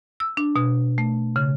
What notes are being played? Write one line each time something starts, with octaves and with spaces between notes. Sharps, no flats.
E6
D4
B2
A3
C#3